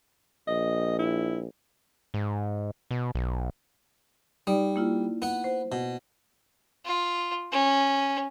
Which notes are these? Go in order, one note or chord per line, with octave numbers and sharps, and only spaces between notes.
A#1 D#5
E4
G#2
B2
B1
G3 D#4 D5
A#3 E4 F4
B3 F#5
C5
B2
F4
C#4